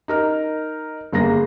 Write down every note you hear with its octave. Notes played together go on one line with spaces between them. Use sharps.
D#4 A#4 F6
G1 A#3 G#4 A#6